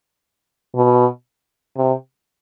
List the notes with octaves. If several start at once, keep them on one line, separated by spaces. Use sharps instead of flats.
B2
C3